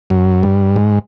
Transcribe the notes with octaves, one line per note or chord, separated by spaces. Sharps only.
F#2
G2
G#2